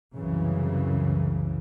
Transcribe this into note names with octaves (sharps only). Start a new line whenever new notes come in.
C2 F#2 C#3 E3